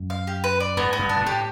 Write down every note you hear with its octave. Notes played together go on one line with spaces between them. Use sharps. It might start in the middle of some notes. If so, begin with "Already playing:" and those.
Already playing: F#2
F5
G4
B4
D5
G#2 B3
B3
G2
D4
A#2
A2
G4